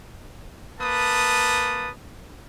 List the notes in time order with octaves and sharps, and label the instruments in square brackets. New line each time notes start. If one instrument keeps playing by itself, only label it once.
[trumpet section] A#3 B4 A5 D#6